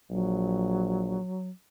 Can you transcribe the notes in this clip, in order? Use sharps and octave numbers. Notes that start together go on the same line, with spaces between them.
A#1 F#3